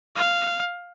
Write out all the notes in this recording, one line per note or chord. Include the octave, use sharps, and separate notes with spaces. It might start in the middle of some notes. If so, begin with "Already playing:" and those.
F5